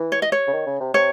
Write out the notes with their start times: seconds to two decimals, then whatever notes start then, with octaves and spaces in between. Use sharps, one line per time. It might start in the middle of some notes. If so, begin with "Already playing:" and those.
Already playing: E3
0.12 C#5
0.22 D#5
0.32 C#5
0.47 C#3
0.53 D#3
0.66 C#3
0.80 C3
0.94 C3 C#5